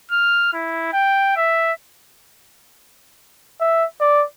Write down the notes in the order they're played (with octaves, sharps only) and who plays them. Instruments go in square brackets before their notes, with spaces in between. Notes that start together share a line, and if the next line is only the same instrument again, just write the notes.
[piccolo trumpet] F6
E4
G5
E5
[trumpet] E5
D5